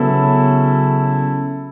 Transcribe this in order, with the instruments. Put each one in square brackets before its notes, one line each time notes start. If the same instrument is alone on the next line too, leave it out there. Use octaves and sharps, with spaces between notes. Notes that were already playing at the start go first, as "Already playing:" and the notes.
Already playing: [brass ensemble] C#3 F#3 C#4 E4 A4 [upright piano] B3